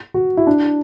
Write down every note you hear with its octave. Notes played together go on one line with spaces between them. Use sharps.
F#4
E4
D4